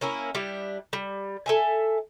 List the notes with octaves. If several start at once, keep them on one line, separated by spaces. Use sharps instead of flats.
A#3 C#4 E4 A#4
G3 D4 E4 G4
G3
A4 E5 G#5